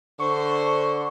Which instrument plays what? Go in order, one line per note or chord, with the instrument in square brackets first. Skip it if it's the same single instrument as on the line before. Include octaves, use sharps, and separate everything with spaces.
[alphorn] D3 [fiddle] C5 [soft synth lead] C#6